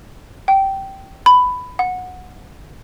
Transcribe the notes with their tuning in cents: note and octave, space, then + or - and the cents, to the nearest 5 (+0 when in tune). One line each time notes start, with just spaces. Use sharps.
G5 -15
B5 +15
F#5 -15